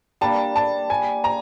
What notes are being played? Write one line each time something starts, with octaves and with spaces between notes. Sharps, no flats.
G3 A#3 D4 A5
A5
G#5
A#5